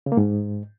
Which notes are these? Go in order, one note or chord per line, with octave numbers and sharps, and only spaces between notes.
C#3
A#3
G#2